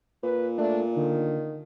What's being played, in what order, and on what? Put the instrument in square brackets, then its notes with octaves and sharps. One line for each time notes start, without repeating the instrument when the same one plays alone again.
[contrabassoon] A#2 [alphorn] B4
[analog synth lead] A3 [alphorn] D4
[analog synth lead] D3 [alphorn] D#3